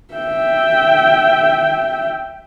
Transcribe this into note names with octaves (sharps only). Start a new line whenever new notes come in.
E5 G5